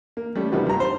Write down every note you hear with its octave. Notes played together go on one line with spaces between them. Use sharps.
A#3
G3 A3 C#4
C3 D#3 F3 G3 F#4 B4
G2 A#5
C5